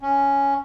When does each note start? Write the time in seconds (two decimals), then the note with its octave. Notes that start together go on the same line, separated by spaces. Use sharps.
0.01 C#4